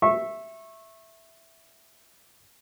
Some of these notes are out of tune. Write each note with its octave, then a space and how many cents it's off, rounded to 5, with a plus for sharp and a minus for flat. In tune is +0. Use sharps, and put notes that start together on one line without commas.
E5 +0 C#6 -25